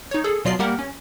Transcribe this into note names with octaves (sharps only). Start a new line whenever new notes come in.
D#4 C#5
G#4 A4
B2 F#3 F4 D5 D#5 C7
G3 A#3 G4 A#4 F#5
C#4